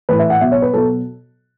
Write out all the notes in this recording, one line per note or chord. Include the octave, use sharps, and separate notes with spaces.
A2 E3 B4
E5
F#5
B2 F#3 E5
C#5
B4
B2 F#3 A4